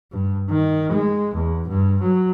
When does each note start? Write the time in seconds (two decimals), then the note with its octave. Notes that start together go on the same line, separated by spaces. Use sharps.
0.12 G2
0.50 D#3
0.92 G#3
1.35 E2
1.68 G2
2.02 F#3